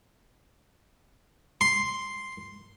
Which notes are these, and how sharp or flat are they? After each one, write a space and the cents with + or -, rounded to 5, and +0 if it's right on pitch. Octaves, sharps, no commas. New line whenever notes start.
C6 +0